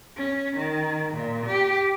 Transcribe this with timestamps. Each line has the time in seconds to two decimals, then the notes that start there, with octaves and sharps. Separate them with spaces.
0.18 C#4
0.57 D#3
1.15 A#2
1.47 G4